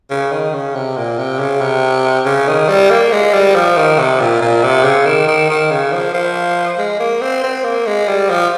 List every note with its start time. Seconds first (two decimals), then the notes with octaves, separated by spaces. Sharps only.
0.10 C#3
0.32 D#3
0.54 C#3
0.75 C3
0.97 A#2
1.18 C3
1.39 C#3
1.61 C3
2.25 C#3
2.48 D#3
2.68 G3
2.90 A#3
3.12 G#3
3.33 G3
3.55 F3
3.77 D#3
3.99 C3
4.20 A#2
4.41 A#2
4.63 C3
4.84 C#3
5.06 D#3
5.27 D#3
5.49 D#3
5.71 C#3
5.92 F3
6.14 F3
6.78 G#3
7.00 A#3
7.22 C4
7.44 C4
7.65 A#3
7.87 G#3
8.08 G3
8.30 F3